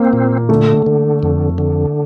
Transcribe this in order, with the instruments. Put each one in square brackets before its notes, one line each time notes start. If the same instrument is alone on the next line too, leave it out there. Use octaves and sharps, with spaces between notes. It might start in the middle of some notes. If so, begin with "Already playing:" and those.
Already playing: [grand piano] A#3 [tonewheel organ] C4
[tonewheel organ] A#2
[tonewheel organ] D3 [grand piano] A3
[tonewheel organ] D3
F2
D3